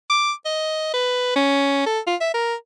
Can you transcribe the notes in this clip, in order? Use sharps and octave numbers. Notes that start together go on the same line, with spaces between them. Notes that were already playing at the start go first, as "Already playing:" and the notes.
D6
D#5
B4
C#4
A4
F4
E5
A#4